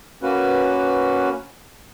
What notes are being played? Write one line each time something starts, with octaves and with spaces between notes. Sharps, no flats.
A#3 C#4 F#4 B4